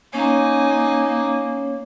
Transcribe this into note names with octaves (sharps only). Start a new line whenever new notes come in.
A#3 C#4 D#4 C#5 G#5